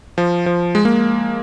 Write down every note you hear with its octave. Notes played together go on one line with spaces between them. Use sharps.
F3
F3
G#3
A#3